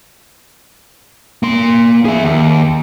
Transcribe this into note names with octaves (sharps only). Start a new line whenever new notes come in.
A#3 C6
G#4 E5
D#2